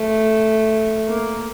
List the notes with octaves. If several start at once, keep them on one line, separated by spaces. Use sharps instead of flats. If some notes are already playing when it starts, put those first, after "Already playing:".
Already playing: A3
A#3